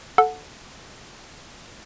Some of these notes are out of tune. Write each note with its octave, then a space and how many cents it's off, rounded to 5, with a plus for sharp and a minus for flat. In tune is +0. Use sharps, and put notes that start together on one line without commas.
A4 +0 F#5 -15